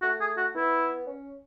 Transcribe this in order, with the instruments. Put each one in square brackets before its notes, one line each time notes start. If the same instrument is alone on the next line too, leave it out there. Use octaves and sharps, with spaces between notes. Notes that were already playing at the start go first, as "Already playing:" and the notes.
[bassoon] A3 [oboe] F#4
[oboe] G#4
F#4
[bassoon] B3 [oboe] E4
[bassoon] C#4